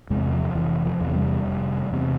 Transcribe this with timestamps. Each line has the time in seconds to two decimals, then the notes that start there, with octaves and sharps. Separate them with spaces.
0.10 E2 C3 G#3
0.32 F3
0.55 F1 E3
0.86 F3
1.00 E2 C3
1.15 G3
1.46 F1
1.90 E2 C3